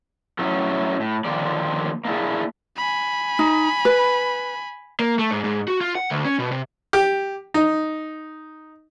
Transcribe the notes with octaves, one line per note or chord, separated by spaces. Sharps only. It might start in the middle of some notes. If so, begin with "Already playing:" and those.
F#3 A3 C#4 E4
A2
D3 D#3 F3 A#3 D5
A#3 D4 E4 G#4
G#5 B5
D#4
B4
A#3
A3
G#2
G#2
F#4
F4
F#5
D2
C#4
B2
C3
G4
D#4